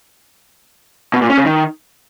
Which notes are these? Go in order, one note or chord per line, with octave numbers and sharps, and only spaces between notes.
B2
A#2
C#4
C#3
D#3